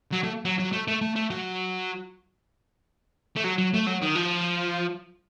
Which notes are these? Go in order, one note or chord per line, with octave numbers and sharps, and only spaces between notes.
F#3
A3
F#3
F#3
A3
A3
A3
A3
F#3
A3
F#3
F#3
A3
F#3
D#3
F3